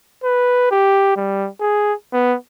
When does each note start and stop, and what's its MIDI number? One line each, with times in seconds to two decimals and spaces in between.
0.24 0.66 71
0.71 1.12 67
1.16 1.49 55
1.60 1.93 68
2.13 2.35 59